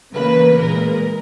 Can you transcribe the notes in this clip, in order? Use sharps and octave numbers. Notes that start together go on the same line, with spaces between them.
C#3 E3 A#3 B4
A#2 G#3 A#4